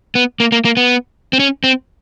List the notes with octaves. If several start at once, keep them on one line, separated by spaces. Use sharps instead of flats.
B3
A#3
A#3
A#3
B3
C4
C#4
C4